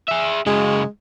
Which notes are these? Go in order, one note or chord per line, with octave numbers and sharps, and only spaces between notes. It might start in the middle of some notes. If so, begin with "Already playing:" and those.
G#4 E5
C#3 F#3 G#3